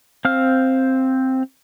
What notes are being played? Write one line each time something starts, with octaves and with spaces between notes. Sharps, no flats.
C4 F5 F6